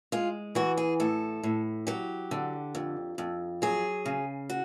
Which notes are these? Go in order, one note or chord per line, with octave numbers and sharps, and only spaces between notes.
G#3 F4
E3 F#4
G#4
A2 A4
A2
F#3 G4
D3
F2
F2
F#3 G#4
C#3
F#4